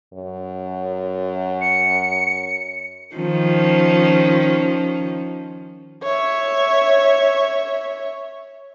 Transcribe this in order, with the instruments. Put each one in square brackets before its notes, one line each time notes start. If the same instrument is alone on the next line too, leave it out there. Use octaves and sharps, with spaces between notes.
[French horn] F#2
[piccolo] C#7
[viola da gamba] D#3 F3 C#4
[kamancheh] C#5 E5